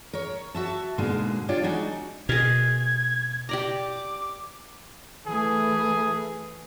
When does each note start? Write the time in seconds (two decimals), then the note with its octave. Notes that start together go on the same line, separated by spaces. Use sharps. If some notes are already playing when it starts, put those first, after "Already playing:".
0.13 A#4 C#5
0.55 F#4 E5 A5
0.98 G#2 B2 D3 G#3 A#3
1.49 D4 F4 G4 C#5 D5
1.63 G#3 D4 D#4 F#4
2.29 B2 G#4 A#4 G#6
3.49 G4 D5 A#5 D6
5.27 E3 A3 G#4